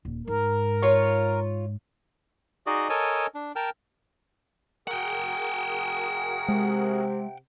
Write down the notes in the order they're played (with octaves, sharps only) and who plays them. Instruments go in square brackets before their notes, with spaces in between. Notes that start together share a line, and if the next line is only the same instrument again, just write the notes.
[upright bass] D#1
[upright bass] G#2 [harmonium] A#4
[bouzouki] F4 C#5
[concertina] D#4 F#4 G#4 D5 D#5
A4 A#4 C#5 D#5 G#5 A5
D4
A#4 G5 A5 F6
[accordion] F#4 G#4 A#4 [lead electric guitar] F#5 G5
[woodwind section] C3 [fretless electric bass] G#3